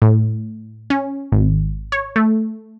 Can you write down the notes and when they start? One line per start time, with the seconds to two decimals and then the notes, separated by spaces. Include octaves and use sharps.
0.02 A2
0.90 C#4
1.32 G#1
1.92 C#5
2.16 A3